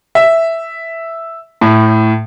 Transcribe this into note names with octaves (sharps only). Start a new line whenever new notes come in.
E5
A2